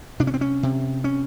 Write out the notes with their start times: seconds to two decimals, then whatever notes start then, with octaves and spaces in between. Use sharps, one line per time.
0.20 C3 D4
0.27 C#4
0.34 C4
0.41 C#4
0.63 C3
1.04 C#4